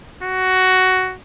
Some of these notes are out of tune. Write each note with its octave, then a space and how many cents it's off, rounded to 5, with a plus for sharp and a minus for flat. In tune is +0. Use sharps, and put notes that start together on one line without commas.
F#4 +10